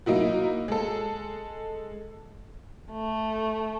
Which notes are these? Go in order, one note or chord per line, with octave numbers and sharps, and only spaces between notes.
F#3 A#3 D#4 E4 F#4
G#3 A4
A3